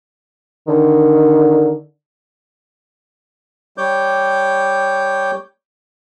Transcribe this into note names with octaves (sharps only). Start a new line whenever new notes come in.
D3 D#3
G3 C#5 D6 G6